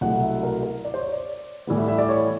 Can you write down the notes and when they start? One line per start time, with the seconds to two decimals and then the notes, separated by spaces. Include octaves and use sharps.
0.01 C2 B2 F#3 A3 F#5
0.22 E5
0.43 A#4
0.63 A#4
0.84 D5
0.94 C5
0.99 C#5
1.12 D5
1.67 A2 E3 G3 B3
1.77 E5
1.88 E5
1.98 D5
2.09 C#5